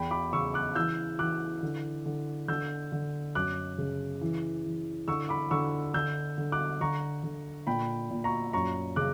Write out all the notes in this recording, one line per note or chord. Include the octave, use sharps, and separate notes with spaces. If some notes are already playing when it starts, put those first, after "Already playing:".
Already playing: E2 G5 B5
B5 D6
C#3 C#6 E6
D6 F#6
E3 E6 G6
E3 D6 F#6
D3
D3
D3 E6 G6
D3
F#2 D6 F#6
C#3
E3
E3
D3 C#6 E6
B5 D6
D3 C#6 E6
D3 E6 G6
D3
D6 F#6
D3 A#5 C#6
D3
A#2 G5 B5
A#2
A#5 C#6
F#2 A#5 C#6
C#3 D6 F#6